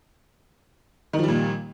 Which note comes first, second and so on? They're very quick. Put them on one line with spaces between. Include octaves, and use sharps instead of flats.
D#3 F3 G3 A#2